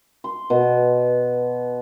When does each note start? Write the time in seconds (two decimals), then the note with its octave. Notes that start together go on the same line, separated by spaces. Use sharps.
0.24 C6
0.50 B2